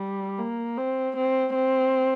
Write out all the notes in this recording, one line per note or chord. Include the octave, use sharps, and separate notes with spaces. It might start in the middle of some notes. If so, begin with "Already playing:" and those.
Already playing: G3
A#3
C4
C4
C4